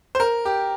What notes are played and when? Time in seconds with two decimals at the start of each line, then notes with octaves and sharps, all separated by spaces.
0.15 C5
0.20 A#4
0.45 G4